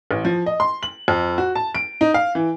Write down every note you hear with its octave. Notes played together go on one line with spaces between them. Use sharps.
A1
F3
D#5
C6
F#7
F2
F#4
A5
D7
D#4
F5
E3